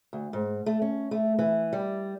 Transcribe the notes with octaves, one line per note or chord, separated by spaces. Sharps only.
D2
G#2
A3
C#4
A3
E3
G3